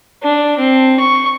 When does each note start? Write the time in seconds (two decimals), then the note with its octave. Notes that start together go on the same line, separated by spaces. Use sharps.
0.23 D4
0.58 C4
0.99 C#6